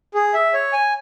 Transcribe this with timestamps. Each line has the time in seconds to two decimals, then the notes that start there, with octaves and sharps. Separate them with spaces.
0.14 G#4
0.34 E5
0.54 C#5
0.73 G#5